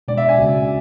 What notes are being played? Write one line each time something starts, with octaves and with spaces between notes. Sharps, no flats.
B2 G#3 D4 D5
E5
G#5
C#2 C#3 G#3 C#4 F#4